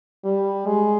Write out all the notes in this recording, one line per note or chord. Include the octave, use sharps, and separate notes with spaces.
G3
G#3